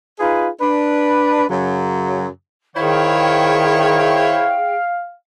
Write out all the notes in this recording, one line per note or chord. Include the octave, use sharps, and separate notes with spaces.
D#4 F4 G#4 B4
D4 B4
F#2 C#3 F#3
D#3 E4 G#4 C5 C#5 F5 G5